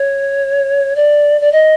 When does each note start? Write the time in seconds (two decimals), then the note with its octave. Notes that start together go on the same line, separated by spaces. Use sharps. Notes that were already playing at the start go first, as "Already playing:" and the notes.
Already playing: C#5
0.96 D5
1.41 D5
1.52 D#5